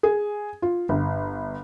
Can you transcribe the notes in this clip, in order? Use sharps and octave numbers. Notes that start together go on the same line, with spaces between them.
G#4
F4
G1